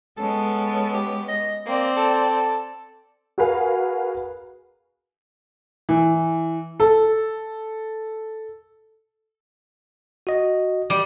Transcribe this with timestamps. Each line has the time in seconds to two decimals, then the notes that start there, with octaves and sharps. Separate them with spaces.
0.18 G#3 B3 C#4 A4
0.94 G4
1.29 D#5
1.67 A#3 C4 D5
1.97 A4
3.38 F#4 G#4 A#4 B4 F5 G#5
5.89 E3
6.80 A4
10.27 F#4 D#5
10.90 G3